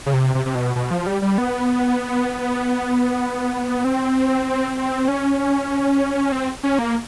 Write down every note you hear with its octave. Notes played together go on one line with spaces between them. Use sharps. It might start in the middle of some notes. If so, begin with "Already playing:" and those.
C#3
C3
C3
C3
B2
B2
F3
G3
G3
B3
C4
C#4
C4
C#4
A#3